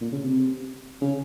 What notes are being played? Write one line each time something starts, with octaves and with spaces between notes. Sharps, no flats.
A#2
C#3
C3
C#3